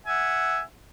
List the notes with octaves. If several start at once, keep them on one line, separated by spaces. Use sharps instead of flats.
E5 F#5 G#5